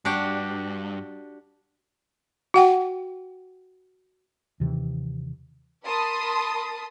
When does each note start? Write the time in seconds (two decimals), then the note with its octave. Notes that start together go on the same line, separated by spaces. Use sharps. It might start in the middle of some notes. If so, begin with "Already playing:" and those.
0.05 G2 D4 F#4 G4
2.54 F#4 F#5 G5
4.60 D#2 C3 E3
5.84 A#4 A5 B5 C6 D#6